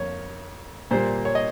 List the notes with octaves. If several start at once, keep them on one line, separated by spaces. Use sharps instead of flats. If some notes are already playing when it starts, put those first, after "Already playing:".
Already playing: F2 A#3 C#5
A#2 G3 A#3 C5
C#5
D#5